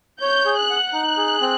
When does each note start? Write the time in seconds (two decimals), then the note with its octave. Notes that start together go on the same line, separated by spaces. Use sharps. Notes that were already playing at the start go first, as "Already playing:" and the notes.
0.21 C#5 G6
0.45 G#4
0.57 F#6
0.70 F#5
0.93 D#4 F#6
1.17 G#4
1.41 C4